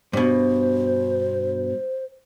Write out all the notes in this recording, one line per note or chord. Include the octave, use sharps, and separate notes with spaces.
G2 B2 C5